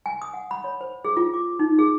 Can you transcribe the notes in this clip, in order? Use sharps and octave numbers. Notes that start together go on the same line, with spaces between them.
G#5
D#6
F#5
B5
C#5
C5
G#4
F4
D6
D#4
G#4